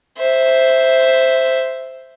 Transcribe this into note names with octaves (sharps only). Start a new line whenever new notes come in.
C5 E5